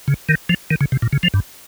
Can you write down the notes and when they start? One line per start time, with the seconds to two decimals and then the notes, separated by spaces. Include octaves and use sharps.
0.08 C#3
0.29 D#3
0.49 F3
0.70 D#3
0.81 C#3
0.92 C3
1.02 A#2
1.13 C#3
1.23 F3
1.34 G2